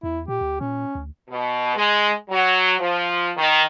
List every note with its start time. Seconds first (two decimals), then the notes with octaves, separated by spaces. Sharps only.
0.03 E2 E4
0.28 A#2 G4
0.41 D2
0.61 A#2 C#4
0.95 D2
1.29 B2
1.76 G#3
2.30 F#3
2.80 F3
3.37 D#3